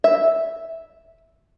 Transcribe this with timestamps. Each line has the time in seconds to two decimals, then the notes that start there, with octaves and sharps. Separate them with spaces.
0.04 E5